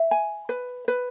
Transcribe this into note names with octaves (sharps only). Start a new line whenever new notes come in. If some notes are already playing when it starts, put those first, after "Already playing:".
Already playing: E5
G#5
B4
B4